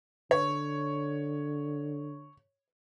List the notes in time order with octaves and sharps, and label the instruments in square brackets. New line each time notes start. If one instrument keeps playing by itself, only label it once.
[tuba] D3 [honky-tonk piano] C#5